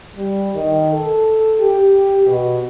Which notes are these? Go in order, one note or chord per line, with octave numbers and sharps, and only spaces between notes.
G3
D#3
A4
G4
B2